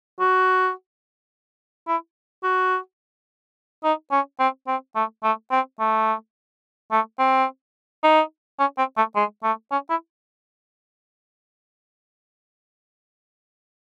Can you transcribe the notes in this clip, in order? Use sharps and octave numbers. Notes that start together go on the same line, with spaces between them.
F#4
E4
F#4
D#4
C#4
C4
C4
A3
A3
C4
A3
A3
C4
D#4
C#4
C4
A3
G#3
A3
C#4
E4